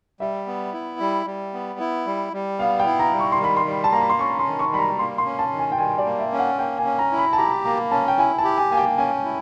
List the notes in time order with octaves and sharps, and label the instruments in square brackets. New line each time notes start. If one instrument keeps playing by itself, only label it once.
[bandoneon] G3 [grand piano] E5
[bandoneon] B3
E4
G3
G3
B3
E4
G3
G3
[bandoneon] B3 [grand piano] F5
[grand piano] G5
[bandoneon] E4
[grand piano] A#5
[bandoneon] G3
[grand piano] C#6
C6
[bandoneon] D#3
[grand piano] B5
C6
[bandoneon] G3
[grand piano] A5
[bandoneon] A#3 [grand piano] A#5
[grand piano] B5
C6
[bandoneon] C#4 [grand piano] C#6
[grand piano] C6
[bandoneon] D#3
[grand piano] C#6
[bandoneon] G3 [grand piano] B5
[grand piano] A#5
[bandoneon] A#3 [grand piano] C6
[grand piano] C6
[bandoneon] C#4
[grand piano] A5
[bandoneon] D#3
[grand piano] G#5
G5
[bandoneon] G3 [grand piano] G#5
[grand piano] D5
[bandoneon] A#3
[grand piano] E5
[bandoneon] C#4
[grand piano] F#5
[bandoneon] A#3 [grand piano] G5
[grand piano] G#5
[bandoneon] C#4
[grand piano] A#5
[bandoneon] E4
[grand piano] B5
A5
[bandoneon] G4 [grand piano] A#5
[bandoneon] A#3 [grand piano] A#5
[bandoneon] C#4 [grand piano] A5
[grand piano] G5
[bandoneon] E4 [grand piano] G#5
[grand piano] A5
[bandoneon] G4
[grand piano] G#5
[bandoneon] A#3 [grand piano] G#5
[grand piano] G5
[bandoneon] C#4 [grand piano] G#5
[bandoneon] E4